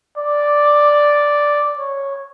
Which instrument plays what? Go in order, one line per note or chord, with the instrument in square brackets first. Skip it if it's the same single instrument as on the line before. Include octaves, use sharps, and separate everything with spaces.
[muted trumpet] D5
C#5